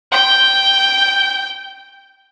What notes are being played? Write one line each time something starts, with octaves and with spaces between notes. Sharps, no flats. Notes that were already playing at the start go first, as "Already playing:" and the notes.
G5 G6